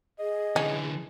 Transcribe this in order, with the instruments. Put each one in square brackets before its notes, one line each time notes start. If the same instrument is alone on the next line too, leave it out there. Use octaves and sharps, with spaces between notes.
[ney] G#4 [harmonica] D#5
[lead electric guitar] D3 E3 [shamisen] C#4